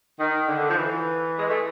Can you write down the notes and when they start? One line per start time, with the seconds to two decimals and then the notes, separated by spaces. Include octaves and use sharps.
0.19 D#3
0.48 D3
0.69 F3
0.75 E3
1.39 G#3
1.48 A3